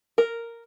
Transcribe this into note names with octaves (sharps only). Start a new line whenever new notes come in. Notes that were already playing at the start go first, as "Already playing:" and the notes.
A#4